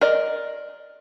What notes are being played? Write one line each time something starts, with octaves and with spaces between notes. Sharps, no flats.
A#4 D5 D#5